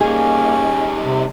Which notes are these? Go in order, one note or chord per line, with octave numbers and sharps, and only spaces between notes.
G3 A#3 C#4 D#4 G#4
C3